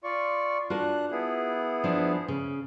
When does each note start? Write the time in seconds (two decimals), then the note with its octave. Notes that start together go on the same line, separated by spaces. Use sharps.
0.04 F4 D5 C#6
0.70 D4 F4 F#4 A#4 F#6
1.11 B3 E4 G#4
1.84 F3 D4
2.28 C#3